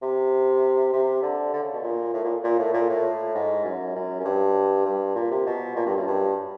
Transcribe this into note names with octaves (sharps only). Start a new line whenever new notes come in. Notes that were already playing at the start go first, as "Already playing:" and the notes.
C3
C3
D3
D3
C#3
B2
A#2
A2
A#2
A#2
A2
A#2
A2
G#2
F#2
F#2
F#2
G2
G2
A#2
C3
B2
A#2
G2
F#2
G2